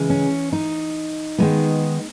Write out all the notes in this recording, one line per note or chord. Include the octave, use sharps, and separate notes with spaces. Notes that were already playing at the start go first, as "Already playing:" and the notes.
Already playing: C#3 E3 G#3
C#4
D#4
D#3 G#3 B3